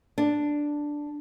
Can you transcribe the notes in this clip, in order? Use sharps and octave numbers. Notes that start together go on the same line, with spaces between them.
D4